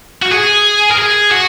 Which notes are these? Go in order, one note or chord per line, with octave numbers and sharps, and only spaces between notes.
F#4
G#4
A#4
G#4
F#4